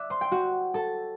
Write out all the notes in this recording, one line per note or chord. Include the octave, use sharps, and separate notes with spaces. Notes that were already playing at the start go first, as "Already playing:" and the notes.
Already playing: D5 E5 E6 F#6
C5 C6
G5
F#4 F#5
A4 A5